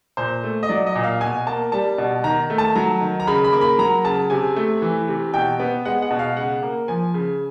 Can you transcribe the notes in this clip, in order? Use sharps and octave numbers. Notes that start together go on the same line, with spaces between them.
A#2 C5
A3
D#5
F#3 D5
D#5
A#2
F5
B2 G#5
A#3 A5
G3 A5
B2
D#3 A#5
A3
A5
F#3 A#5
D#3
A#5
C#3 B5
B5
A#3
B5
F#3 A#5
C#3 A5
C3 G#5
A3
E3
C3
B2 G5
B3
G#3 F#5
F#5
B2
F5
C#3 F#5
A#3
F3 G#5
C#3